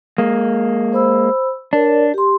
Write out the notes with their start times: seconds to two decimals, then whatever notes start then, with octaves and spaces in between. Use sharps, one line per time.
0.18 G#3 A#3
0.93 C5 B5 E6
1.73 D4 A#4 C#5 D5
2.14 G4 C6